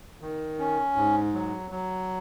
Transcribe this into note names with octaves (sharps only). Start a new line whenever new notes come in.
D#3
C#4
G#2
F#3
F#3